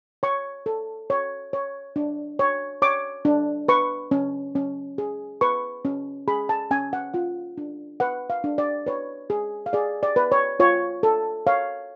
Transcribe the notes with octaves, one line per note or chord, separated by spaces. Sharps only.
C#5 C#6
A4
C#5
C#5
D4
C#5
C#5 D6
D4
B4 C#6
C#4
C#4
G#4
B4 C#6
C#4
G#4 B5
A5
C#4 G#5
F#5
F4 F#5
D4
B4 F#5
F5
D4
D5
B4 C#5
G#4
F5
G#4 D5
D5
B4
C#5
F4 C#5
A4
C#5 F5